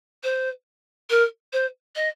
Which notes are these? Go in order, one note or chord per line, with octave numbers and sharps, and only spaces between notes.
C5
A#4
C5
D#5